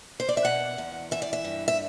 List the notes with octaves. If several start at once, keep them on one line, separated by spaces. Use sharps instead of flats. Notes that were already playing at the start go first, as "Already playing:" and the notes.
C5
D5
E5
B2 F#5
E2
E3 E5
D5
E5
G2
E5